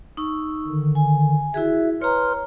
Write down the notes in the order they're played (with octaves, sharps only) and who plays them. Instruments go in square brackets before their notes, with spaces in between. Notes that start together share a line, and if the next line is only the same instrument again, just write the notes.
[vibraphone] D#4 C#6 E6
[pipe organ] D3 D#3
[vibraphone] G#5
[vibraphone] E4 F#4 G#4 [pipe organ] E5
[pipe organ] B4 C6 F6 [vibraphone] C#5 A#5